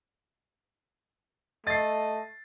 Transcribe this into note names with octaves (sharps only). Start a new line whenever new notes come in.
A3 D#5 A6 C7